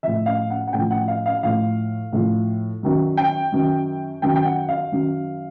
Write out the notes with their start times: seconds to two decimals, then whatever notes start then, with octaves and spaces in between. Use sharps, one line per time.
0.03 A2 F3 E5
0.26 F5
0.50 F#5
0.67 F#5
0.73 A2 F3 G5
0.90 F#5
1.08 F5
1.26 F5
1.43 A2 F3 F5
2.13 A2 F3
2.83 F#2 D#3 F#3
3.17 G5
3.52 F#2 D#3 F#3
4.22 F#2 D#3 F#3 G5
4.36 G5
4.45 F#5
4.69 F5
4.92 F#2 D#3 F#3